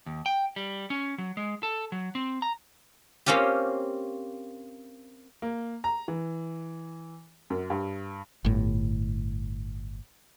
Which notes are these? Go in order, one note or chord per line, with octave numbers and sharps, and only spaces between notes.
D#2
G5
G3
C#4
F#3
G#3
A4
F#3
C4
A#5
A#3 C4 C#4 F4 G4
A#3
A#5
E3
F#2
G2
G1 A2